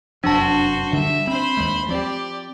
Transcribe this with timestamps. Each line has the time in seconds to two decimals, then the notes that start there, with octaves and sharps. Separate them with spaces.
0.24 F1 F#2 F3 D4 F#4 C5 A5
0.93 D3 G3 E5
1.27 C4 C5 B5
1.57 D#2 G#3 A3
1.89 F3 C4 G4 D5